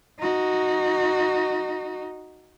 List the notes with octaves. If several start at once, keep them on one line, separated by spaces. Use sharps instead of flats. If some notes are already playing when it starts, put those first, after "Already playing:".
D#4 F#4